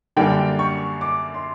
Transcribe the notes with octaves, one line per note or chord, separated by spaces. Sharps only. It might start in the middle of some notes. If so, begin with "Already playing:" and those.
F#2 D3 G3 A#3 D4 G5
C#6
D6
C6